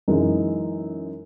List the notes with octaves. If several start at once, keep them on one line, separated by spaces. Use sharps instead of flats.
F#2 E3 G#3 D#4